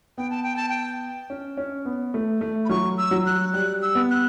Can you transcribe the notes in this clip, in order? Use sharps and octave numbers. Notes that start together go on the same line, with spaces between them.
B3 G5
A5
G5
A5
G5
C#4
C#4
B3
A3
A3
B5
F#3 C#6
E6
F#3
F#6
G3 F#6
E6
B3
F#6